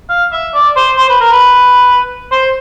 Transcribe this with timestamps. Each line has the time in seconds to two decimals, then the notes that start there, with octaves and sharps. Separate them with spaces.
0.09 F5
0.32 E5
0.54 D5
0.76 C5
0.98 C5
1.09 B4
1.20 A#4
1.32 B4
2.31 C5